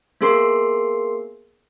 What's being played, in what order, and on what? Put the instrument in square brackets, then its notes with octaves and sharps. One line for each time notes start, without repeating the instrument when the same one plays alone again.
[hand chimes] A#3 B3 G#4 A#4 C6 C7